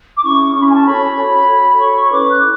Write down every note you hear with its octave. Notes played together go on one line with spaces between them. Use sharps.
D6
C#4 E4 G#4 C#6
C#4 E4 G#4 C#6
B5
C#6
G#5
A5
F#4 A4 C#5 B5
F#4 A4 C#5
F#4 A4 C#5
F#4 A4 C#5 C#6
C#6
C#4 E4 B4 D6
F#6
E4